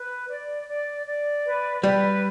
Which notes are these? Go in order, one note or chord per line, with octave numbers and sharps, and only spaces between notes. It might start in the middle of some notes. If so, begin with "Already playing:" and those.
Already playing: B4
D5
D5
D5
B4
G3 B4